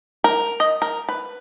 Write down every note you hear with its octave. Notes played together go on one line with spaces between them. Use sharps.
A#4
D#5
A#4
B4